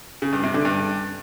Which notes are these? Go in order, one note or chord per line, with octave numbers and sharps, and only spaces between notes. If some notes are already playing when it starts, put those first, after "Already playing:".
C#3
G2
C3
D3
G2